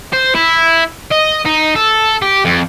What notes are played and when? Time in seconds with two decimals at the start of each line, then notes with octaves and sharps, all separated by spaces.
0.13 C5
0.35 E4
1.11 D#5
1.45 D#4
1.75 A4
2.22 G4
2.45 F2